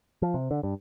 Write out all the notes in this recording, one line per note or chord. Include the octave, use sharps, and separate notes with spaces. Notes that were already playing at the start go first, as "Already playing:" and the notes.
F3
C3
D3
G2